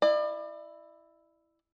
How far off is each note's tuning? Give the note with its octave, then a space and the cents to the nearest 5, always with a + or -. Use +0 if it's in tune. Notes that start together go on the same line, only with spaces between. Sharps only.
E4 +0 D5 +35